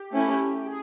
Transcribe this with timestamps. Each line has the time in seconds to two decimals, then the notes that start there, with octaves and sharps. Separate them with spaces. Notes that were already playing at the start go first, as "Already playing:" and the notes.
Already playing: G4
0.12 A3 C#4 E4
0.61 G4
0.66 G#4